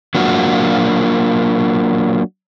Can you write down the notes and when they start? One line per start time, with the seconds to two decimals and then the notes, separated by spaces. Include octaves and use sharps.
0.15 F#3 A#3 D4 F4 F#4